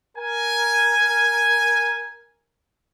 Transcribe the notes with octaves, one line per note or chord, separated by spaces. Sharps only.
A#4 G#5